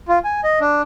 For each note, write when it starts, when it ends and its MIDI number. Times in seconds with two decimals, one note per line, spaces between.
0.08 0.19 65
0.24 0.41 80
0.44 0.59 75
0.61 0.82 62